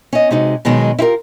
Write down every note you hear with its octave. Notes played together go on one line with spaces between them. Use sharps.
C#4 D#5
C3 G#3 D#4 F#4
B2 D#3 F#3 G#3 D#4
E4 F4 G4 A#4